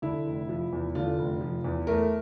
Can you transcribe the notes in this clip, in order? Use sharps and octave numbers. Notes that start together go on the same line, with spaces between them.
D3 E4
F1
F3
E2
D3 F4
F1
F3
E2
A3 A#4